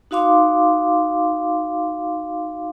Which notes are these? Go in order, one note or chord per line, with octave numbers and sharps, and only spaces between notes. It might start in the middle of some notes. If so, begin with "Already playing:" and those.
D#4 F#4 F5 C6 D6